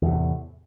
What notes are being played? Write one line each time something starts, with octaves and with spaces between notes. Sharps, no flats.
E2 A2 C3